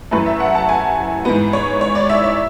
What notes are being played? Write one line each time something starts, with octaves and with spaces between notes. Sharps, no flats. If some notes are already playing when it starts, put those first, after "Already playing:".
F#2 E3 A3 B4
E5
F#5
A5
G#5
G#2 E3 B3
C#5
C#5
D5
E5
E5